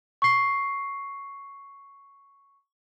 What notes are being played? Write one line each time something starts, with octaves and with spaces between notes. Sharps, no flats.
C#6 C7